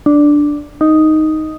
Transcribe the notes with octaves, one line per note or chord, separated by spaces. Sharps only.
D4
D#4